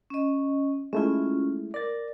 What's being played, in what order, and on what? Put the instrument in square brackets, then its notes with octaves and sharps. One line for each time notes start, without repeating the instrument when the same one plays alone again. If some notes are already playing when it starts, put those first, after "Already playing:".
[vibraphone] C#4 D#5
[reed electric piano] G#3 A3 E4 [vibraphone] C#4 F4
[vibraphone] A#4 [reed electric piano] D5 A6